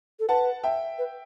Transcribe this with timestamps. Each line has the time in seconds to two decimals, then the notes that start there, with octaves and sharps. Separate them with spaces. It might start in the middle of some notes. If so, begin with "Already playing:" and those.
0.20 A4
0.28 B4 F#5 A5
0.63 E5 G5
0.98 B4